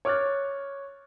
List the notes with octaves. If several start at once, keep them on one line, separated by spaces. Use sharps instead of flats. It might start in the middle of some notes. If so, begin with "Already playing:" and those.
C#5 D6 F6 F#6 A6